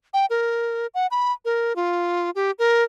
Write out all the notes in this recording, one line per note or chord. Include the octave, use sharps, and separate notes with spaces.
G5
A#4
F#5
B5
A#4
F4
G4
A#4